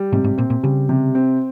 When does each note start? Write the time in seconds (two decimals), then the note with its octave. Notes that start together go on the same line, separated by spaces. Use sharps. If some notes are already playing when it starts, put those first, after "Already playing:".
Already playing: G3
0.12 G#2 C3
0.24 G#2
0.38 A#2 C4
0.50 A#2
0.63 C#3 G3
0.89 C3
1.15 C4